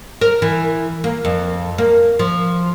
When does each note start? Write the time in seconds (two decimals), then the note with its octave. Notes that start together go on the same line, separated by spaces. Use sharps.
0.21 A#4
0.42 E3
1.04 A#3
1.25 F2
1.78 A#3
2.19 F3